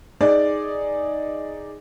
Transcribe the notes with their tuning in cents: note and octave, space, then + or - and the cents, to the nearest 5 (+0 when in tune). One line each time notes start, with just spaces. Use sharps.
D#4 +0 G#4 +0 D5 +0